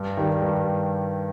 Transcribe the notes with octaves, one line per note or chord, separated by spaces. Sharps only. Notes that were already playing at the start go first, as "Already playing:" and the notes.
Already playing: G2
D#3 G3
G2